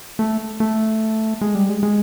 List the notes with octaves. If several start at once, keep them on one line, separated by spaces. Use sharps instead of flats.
A3
A3
G#3
G3
G#3
G#3